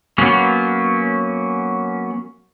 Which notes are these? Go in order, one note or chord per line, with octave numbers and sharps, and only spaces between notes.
F#3 A#3 B3 C#4